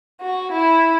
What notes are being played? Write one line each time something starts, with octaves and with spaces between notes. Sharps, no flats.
F#4
E4